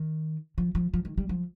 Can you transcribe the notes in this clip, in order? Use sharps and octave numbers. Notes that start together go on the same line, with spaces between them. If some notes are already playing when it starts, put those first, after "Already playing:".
Already playing: D#3
F3
F3
F3
D#3
G3
F3